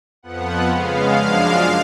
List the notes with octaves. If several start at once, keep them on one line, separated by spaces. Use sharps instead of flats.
F2 F3 B3 F#5
C#3 G#3 B3 F5
F#2 F3 G#3 D4